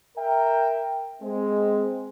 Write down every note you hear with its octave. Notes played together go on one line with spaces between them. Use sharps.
A#4 E5 G5
G#3 C4